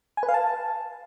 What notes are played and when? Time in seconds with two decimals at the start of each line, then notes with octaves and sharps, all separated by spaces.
0.17 G#5
0.23 B4
0.29 F5
0.34 A5